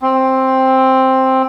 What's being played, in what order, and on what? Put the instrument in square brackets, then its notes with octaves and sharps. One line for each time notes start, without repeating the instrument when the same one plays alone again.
[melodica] C4